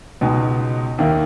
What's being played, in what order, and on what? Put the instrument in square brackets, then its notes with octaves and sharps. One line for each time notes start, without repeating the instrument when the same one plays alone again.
[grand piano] C#2 B2 G#3 D#4
D#2 D#3 A#3 E4